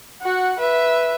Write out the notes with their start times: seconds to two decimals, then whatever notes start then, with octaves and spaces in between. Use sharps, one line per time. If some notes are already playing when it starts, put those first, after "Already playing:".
0.22 F#4 F#5
0.59 B4 E5